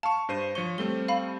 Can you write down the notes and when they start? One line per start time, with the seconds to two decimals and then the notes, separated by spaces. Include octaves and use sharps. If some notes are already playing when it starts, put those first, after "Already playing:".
0.03 F5 A5 C#6
0.29 G2 C5 D#7
0.55 F3 C#5 C#6 G7
0.78 G3 A3 C4 G7
1.08 F5 B5